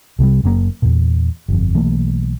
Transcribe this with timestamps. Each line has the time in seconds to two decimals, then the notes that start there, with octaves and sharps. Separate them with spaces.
0.19 C2 C3 E3 G3
0.44 F#1 F#2 A#2 A#3
0.82 E2 A#2
1.48 G1 F2
1.74 B1 E3 A3 A#3